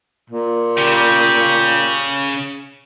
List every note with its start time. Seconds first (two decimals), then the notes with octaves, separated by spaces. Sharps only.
0.30 A#2
0.77 C#3 G4